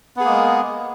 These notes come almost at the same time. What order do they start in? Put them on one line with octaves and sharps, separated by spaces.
B3 G#4 A#3 G#3